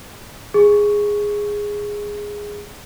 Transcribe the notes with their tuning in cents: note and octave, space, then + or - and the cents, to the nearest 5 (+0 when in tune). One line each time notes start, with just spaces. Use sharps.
G#4 -10 C#6 +0